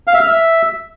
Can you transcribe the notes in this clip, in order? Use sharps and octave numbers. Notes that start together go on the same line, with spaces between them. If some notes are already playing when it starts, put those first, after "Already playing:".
F5
E5
F6
E5